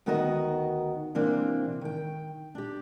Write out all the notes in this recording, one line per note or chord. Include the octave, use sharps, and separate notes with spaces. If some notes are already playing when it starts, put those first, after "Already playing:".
D2 D#3 B3 F#4 A#4 D#5
C3 E3 A#3 C4 D4
D#3 G5
D4 G4